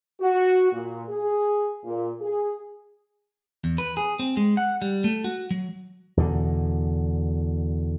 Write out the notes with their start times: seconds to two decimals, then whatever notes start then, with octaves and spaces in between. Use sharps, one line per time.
0.21 F#4
0.72 A#2
1.08 G#4
1.85 A#2
2.21 G#4
3.64 E2
3.78 B4
3.97 G#4
4.19 C4
4.37 G#3
4.57 F#5
4.82 G3
5.04 A3
5.24 F#4
5.51 F#3
6.17 E2 B2 D3